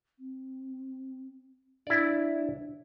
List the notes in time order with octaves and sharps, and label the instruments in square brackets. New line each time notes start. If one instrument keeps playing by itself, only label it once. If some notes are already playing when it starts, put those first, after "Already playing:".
[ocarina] C4
[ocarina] D4 [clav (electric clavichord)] E4 D5